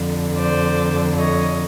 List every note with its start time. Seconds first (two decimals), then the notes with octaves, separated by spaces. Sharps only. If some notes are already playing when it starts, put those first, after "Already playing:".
Already playing: F2 D3
0.37 C5 D5
1.18 C#5 D#5